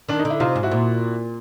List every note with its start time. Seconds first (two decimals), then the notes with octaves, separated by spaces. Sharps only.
0.09 D#3 D4
0.19 D#4
0.25 D3
0.30 E4
0.40 C3 D#4 F4
0.56 G#2
0.63 E4 F#4
0.71 A#2